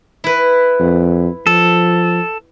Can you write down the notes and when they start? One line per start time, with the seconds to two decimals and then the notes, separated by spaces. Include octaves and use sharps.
0.24 E4 B4
0.80 F2
1.47 F3 A4